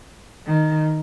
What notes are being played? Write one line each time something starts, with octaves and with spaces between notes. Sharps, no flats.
D#3